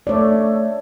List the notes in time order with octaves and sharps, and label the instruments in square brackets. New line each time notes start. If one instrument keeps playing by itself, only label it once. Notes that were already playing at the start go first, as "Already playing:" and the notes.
[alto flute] A3 [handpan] C#5 D5